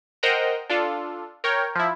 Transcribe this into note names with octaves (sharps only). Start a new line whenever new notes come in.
A#4 C5 D#5 F#5 G5 A#5
D4 F4 A4
A#4 C#5 G5
F3 E4